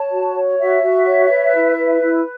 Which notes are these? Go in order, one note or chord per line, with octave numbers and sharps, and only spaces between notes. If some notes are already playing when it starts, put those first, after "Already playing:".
Already playing: C#5 A5
F#4
C#5
F#4 E5
F#4
C#5
B4
E4
B4
E4